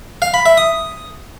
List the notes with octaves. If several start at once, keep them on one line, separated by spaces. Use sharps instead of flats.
F5
B5
E5
D#6